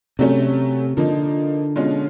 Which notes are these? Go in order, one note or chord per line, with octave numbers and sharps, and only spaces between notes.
C3 F#3 A3 C#4
D3 F3 A#3 D#4
B2 G#3 C#4 F4